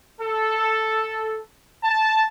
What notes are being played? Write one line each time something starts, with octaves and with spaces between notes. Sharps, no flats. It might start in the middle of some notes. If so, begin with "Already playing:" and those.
A4
A5